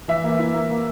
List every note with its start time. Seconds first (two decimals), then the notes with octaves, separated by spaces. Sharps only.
0.08 E3 E5
0.24 A#3
0.39 E4
0.54 A#3
0.71 A#3